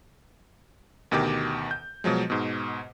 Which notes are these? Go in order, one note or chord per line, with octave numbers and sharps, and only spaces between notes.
D2 B2 D#3 G4 D6
G6
B2 F3 F#3 G#3
G#2 B2